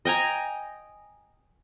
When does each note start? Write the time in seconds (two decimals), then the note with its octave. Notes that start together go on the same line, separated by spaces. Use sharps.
0.05 D#5 G5 G#5 A#5